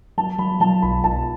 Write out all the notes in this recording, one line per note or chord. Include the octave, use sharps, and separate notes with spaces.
F#3 A5
F#3 B5
F#3 A5
B1 B5
B1 A5